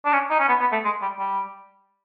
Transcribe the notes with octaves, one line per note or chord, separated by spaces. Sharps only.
D4
C#4
D#4
C#4
B3
B3
A3
G#3
G3
G3